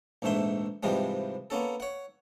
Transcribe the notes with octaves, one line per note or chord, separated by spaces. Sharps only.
A#1 E2 G#2 A3 E5 C6
G#2 C3 E3 F3 G3 G#3
A#3 B3 C#4 A4
C#5 F#5